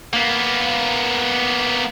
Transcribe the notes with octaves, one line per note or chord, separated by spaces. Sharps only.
A#3 B3